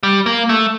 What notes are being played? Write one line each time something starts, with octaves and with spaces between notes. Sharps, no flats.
G3
A#3
A3